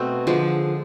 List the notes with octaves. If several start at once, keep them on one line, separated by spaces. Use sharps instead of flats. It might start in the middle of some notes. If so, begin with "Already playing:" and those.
Already playing: B2 A3 C4
D3 F3 G#3